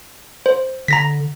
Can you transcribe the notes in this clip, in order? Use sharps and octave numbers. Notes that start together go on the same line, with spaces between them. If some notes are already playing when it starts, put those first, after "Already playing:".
C5
D3 A#5 A#6 B6